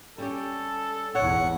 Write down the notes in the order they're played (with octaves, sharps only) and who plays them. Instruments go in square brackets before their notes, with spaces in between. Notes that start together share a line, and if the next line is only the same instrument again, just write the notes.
[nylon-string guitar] G3 C#4 G4 [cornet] A4
[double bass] G#1 E2 [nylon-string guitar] C#5 [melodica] F#5